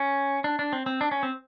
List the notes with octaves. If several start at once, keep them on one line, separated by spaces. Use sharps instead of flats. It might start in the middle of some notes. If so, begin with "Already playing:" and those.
Already playing: C#4
D4
D4
C4
C4
D4
C#4
C4